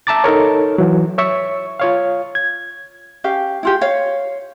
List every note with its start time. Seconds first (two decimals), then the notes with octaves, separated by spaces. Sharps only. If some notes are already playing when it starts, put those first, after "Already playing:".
0.07 E5 A5 A#5 D6 A6
0.24 D#4 A4 A#4 C#5
0.78 E3 F#3
1.18 C#5 E5 C#6
1.80 F4 C#5 F5
2.35 G#6
3.24 C#4 G4 F5
3.63 E4 F4 G4
3.81 C#5 F5